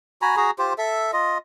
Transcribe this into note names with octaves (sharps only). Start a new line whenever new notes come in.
F#4 G#5 A#5 B5
F#4 G#4 A#5
F4 G4 C5
A4 E5
F4 D#5